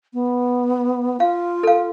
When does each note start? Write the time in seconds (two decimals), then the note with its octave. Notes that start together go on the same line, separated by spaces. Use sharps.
0.14 B3
1.20 F4 F5
1.63 A4 F5